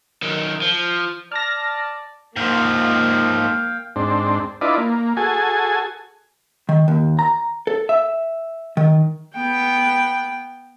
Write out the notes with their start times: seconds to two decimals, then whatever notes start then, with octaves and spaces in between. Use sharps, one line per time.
0.22 F#2 D#3
0.62 F3
1.32 D5 A5 F6 A#6
2.36 G#2 F3 A#3 F5 G5
3.96 G#2 C4 D4
4.61 D4 E4 F4 B4 D5 D#5
4.78 A#3
5.17 F#4 G#4 A4 G#5
6.69 D#3
6.88 D#2
7.19 A#5
7.67 A4
7.89 E5
8.77 D#3
9.36 B3 G5